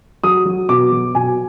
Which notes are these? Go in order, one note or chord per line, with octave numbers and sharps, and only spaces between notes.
F#3 D#6
F#3
B2 D6
F#3
B2 G#5